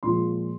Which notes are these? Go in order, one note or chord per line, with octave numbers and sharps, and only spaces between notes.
A#2 F3 G#3 C6